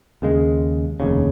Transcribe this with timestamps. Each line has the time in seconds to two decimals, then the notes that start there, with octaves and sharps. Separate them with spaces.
0.22 D#2 C#3 G#3
1.00 F1 D#2 C#3